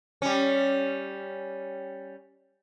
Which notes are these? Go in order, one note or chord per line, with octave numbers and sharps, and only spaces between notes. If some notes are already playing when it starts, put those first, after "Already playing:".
G3 C#4